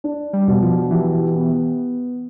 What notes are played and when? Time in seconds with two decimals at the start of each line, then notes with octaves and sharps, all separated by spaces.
0.04 D4
0.33 G3
0.48 B2
0.62 F3
0.90 E3 G4
1.34 B3